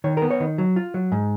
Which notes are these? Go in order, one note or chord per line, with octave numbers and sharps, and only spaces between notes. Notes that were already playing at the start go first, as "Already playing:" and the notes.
D#3 C#5
B3 A#4
C#5
D#3
F#3
F4
F#3
G#2